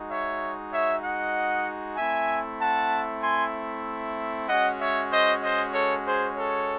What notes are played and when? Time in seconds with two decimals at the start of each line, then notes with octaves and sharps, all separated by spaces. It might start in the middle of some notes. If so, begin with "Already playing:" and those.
Already playing: G#3 D#4 F#4
0.09 C#5 E5
0.72 C#5 E5
1.04 D#5 F#5
1.97 A3 C4 E4 E5 G#5
2.60 F#5 A5
3.23 G#5 C6
4.48 G#3 C#4 F#4 D#5 F#5
4.80 C#5 E5
5.12 C5 D#5
5.43 C5 D#5
5.74 A4 C#5
6.06 G#4 C5
6.37 A4 C#5